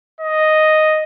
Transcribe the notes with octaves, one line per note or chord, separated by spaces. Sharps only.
D#5